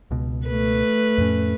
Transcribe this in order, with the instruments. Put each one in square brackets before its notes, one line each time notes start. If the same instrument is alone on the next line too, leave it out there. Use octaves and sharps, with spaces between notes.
[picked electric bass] C#2 B2
[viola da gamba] A3 B4
[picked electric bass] F2 A2 C#4